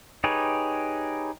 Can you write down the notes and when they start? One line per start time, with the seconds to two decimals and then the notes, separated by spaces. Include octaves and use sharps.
0.24 D#4 G4 G#4 B4 C#5